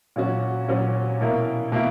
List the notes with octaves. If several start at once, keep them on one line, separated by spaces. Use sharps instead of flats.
A#2 F#3 C#4 F#4
A#2 F#3 C#4 F#4
B2 A#3 E4 A#4
B2 A#3 E4 A#4